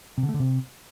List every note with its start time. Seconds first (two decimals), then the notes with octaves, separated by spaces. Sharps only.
0.18 C3
0.23 D3
0.29 A3
0.34 D3
0.40 C3